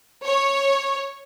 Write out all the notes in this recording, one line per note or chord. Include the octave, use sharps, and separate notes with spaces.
C#5